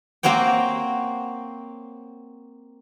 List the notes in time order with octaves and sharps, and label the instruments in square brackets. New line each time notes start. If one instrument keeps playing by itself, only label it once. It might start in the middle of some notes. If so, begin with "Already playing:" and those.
[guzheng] A#3 C4 F#4 C#5 G5